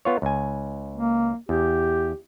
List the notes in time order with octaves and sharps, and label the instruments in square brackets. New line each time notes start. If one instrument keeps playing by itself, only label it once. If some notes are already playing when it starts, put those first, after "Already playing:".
[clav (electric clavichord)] B3 F4 C#5
C#2 G#5
[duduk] A#3
[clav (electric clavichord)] E2 [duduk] G4